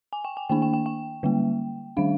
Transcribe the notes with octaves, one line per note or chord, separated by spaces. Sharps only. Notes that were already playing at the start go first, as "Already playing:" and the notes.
G#5
G5
G#5
D#3 A#3 D4 G5
G5
G5
G5
D3 G3 A#3
D#3 G3 D4 F5